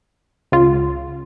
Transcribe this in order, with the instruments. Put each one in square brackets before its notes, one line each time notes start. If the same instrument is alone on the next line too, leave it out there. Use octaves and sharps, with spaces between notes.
[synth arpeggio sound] C#2 F4